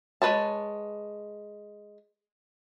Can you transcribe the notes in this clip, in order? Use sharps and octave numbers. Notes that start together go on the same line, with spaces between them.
G#3 B4 C#5 A5